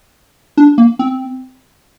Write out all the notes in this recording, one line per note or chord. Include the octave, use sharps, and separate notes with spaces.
D4
A#3
C4